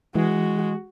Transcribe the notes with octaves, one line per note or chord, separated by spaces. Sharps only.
E3 G#3 F#4